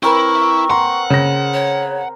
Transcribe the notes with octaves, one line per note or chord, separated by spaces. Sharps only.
C4 E4 A#4 B4 C#6
F#5 A#5 C6
C#3 A#6
C#5